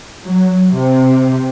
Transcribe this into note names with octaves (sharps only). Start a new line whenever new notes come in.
F#3
C3